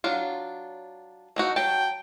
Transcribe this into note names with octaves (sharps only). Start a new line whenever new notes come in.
F#3 D4 F4
A3 D#4 F#4
F#3 G5 A5